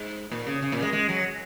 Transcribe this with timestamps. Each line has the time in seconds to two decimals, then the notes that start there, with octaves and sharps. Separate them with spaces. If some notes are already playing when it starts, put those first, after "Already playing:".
Already playing: G#2
0.31 A#2
0.47 C#3
0.62 C#3
0.72 A#2
0.83 G#3
0.93 G#3
1.09 F#3